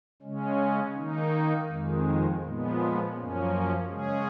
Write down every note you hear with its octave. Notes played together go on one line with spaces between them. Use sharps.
C#3 G#3 C#4
D#3 A#3 D#4
F2 D#3 G#3
A#2 F3 G#3 B3
F#2 F3 A#3 C#4
C#3 G#3 C#4 G#4